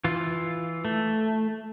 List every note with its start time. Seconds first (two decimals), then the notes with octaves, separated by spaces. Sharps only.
0.04 E3 F4
0.85 A3